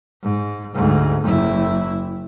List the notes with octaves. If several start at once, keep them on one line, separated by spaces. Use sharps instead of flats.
G#2
D2 G#2
F#1 E4